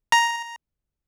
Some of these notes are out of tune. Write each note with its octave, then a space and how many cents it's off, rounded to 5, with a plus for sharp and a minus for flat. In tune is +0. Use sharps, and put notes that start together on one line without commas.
A#5 +5